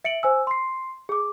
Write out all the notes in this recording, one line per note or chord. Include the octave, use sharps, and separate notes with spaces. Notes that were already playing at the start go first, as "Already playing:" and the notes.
E5 C#7 D7 F#7
C5 G#5 E6
C6 C7
G#4 D6